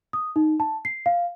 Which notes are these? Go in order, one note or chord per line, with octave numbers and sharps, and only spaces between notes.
D#6
D#4
A5
C7
F5